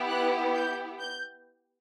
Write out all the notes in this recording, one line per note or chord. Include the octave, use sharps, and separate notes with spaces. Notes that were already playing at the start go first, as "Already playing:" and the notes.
Already playing: B3 E4 G4
F#6
G6
G6